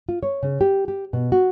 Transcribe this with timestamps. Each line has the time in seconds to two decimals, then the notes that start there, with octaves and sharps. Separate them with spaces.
0.09 F4
0.23 C#5
0.43 C#3
0.61 G4
0.88 G4
1.13 B2
1.32 F#4